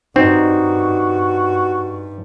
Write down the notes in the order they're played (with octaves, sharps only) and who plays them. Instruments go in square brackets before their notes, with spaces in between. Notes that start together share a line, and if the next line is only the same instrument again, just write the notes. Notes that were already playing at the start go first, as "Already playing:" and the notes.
[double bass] G2 [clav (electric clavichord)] C4 [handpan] D#4 [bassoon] F#4